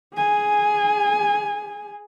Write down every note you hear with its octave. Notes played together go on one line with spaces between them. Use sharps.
G#4 G#5